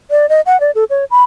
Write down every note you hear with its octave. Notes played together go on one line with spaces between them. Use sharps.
D5
D#5
F#5
D5
A4
C#5
B5